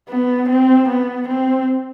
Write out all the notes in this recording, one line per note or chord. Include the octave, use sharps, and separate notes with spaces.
B3
C4
B3
C4